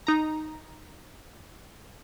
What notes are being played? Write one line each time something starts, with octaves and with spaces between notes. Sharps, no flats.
D#4 A#5